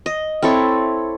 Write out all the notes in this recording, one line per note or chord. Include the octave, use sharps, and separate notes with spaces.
D#5
C4 E4 A4 C#5